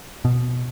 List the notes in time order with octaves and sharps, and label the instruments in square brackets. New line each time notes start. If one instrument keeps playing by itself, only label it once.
[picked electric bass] B2